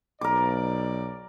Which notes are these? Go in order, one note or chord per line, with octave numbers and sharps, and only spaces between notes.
B1 A#4 D5 D6